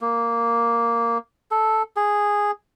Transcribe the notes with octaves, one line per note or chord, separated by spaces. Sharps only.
A#3
A4
G#4